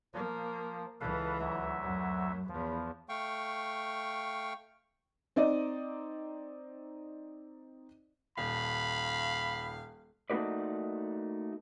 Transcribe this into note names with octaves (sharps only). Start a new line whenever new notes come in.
F3 A#3
C#2 E3 A4 B4 F5
D2 F#3 E5
F#2
E2 F3
A3 F5 G5 C#6
C4 D#4 D5 D#5
D#1 F5 B5
A3 A#3 D#4 F#4 B4 D5